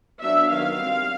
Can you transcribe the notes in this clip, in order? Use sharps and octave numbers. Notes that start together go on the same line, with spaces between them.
F#3 B3 D4 E5
D#3 F#3 B3 F5
G3 C4